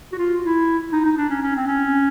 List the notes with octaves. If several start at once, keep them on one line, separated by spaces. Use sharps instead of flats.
F#4
F4
E4
D#4
D#4
D4
C#4
C#4
C4
C#4